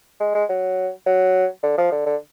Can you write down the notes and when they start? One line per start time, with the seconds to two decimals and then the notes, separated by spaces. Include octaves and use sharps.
0.20 G#3
0.35 G#3
0.49 F#3
1.06 F#3
1.63 D3
1.78 F3
1.92 D3
2.06 D3